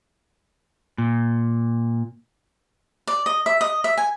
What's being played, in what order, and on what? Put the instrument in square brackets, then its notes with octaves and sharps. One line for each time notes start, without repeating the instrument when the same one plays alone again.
[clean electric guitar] A#2
[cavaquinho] D5
D#5
E5
D#5
E5
G#5